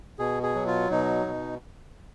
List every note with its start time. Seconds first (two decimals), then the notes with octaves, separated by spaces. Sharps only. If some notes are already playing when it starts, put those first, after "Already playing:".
0.19 B2 G#4
0.43 G#4
0.55 F#3
0.67 F4
0.90 B2 D#4
1.26 B2